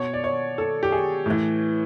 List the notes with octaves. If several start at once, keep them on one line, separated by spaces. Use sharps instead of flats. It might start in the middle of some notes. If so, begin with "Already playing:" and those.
Already playing: B2 C#5
D5
C#5
A4
G4
G#4
A2 E3